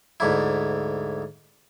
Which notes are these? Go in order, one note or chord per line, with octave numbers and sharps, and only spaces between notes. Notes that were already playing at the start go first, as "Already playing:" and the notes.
D2 G#2 E4